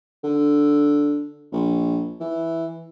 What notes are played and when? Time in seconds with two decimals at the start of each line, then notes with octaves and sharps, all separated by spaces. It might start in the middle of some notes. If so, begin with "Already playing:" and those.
0.24 D3
1.52 A#1
2.20 E3